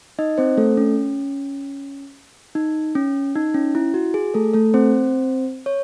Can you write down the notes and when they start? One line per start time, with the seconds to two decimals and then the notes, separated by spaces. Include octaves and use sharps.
0.19 D#4 D#5
0.38 C4 C5
0.57 A3 A4
0.77 C#4
2.55 D#4
2.95 C#4
3.35 D#4
3.54 C#4
3.75 E4
3.94 F#4
4.14 G#4
4.34 A3 A4
4.54 A3 A4
4.74 C4 C5
5.66 C#5